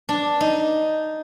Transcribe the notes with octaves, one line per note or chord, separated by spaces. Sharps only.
D4
D#4